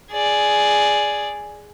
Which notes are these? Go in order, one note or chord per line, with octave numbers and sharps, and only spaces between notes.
G#4 D5